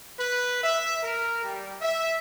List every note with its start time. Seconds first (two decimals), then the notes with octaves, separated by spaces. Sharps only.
0.17 B4
0.62 E5
1.02 A#4
1.42 G3
1.81 E5